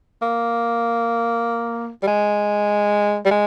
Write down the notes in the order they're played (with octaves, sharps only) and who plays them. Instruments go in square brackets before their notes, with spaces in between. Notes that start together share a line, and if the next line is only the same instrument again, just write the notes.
[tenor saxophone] A#3
G3
G#3
G3
G#3